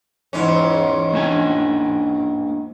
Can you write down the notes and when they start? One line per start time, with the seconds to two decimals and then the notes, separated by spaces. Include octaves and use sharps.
0.33 E2 G#2 C#4
1.13 A#3 D4 G#5